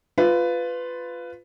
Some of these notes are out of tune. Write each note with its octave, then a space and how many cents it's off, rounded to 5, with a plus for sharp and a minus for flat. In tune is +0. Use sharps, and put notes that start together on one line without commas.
F4 +0 B4 +15